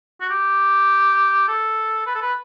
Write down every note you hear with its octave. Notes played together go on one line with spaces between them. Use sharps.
F#4
G4
A4
B4
A4
B4